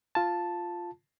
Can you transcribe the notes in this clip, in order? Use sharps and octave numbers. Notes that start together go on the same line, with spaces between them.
F4 A5